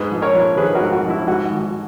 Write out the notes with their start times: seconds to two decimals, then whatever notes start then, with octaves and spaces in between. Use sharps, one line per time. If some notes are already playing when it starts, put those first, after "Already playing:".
Already playing: G#2 G#4 B4
0.11 A#1
0.22 A#4 C#5
0.34 A#1
0.57 D#3 G#4 B4
0.75 F#4 A#4
0.81 G#2
0.92 F#4
1.04 A#1
1.10 E4
1.27 G#2 F#4
1.51 G#1